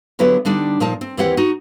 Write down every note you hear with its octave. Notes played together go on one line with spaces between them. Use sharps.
D3 F#3 B3 E4 G4 B4
D3 G3 D4 D#4
A#2 F3 D#4 A#4 A5
C4
D#2 E3 C4 E4 G4 F#5
D#4 F#4